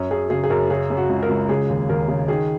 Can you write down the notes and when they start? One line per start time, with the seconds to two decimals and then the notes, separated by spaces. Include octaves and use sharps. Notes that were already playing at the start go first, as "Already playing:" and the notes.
Already playing: F#2 C#4
0.11 F#2 G#4
0.30 C#3 G#4
0.44 G#4
0.50 F#2 A#4
0.69 C#3 G#4
0.90 C#3
0.97 F#4
1.09 C#2
1.23 A#4
1.29 C#2
1.49 C#3 G#4
1.69 D#2
1.89 D#2 A#4
2.08 C#3
2.28 D#3 G#4